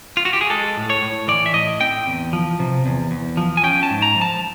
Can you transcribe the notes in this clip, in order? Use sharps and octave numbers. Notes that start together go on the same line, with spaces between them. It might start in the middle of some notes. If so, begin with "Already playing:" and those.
F4
F#4
G4
G#4
G#3 A4
A2
C#5
A2
E3 D5
E5
A2 D#5
C4 G5
E2
F3
C3
E2
E2
F3
G#5
C#4 G5
A5
G#2
A#5
F3
A5